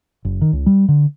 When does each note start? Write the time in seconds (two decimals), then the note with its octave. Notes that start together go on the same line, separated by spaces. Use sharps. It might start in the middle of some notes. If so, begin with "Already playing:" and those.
0.25 F#1
0.41 D#3
0.53 C#2
0.66 G3
0.88 D3